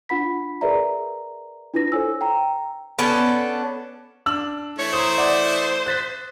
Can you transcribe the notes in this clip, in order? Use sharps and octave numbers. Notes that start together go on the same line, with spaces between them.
D4 F4 F#5 B5 B6
G#4 A#4 B4 D5 E5 A#5
D4 E4 F4 B4 A#6
A4 C5 C#5 G#5 E6
G5 A#5
B3 C#4 D4 A4
D4 E6 F#7
E3 A3 E4 C#5
C5 A#5 C6 D#6
D5 E5 F#5
F#6 A6 B6